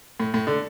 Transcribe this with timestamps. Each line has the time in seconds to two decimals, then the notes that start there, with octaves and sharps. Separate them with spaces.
0.20 A2
0.34 A2
0.47 D3